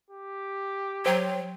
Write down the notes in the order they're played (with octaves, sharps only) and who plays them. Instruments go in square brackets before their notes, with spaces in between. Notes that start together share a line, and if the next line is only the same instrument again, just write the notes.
[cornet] G4
[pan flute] F#3 [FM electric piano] C5 G5